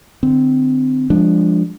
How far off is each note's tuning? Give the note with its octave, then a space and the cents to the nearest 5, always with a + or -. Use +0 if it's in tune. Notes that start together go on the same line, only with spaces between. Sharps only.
D3 +15 C4 -25
F3 +0 G#3 -20 D4 +0